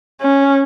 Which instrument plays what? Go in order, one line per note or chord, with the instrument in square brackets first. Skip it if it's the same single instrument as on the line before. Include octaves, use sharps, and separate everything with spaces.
[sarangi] C#4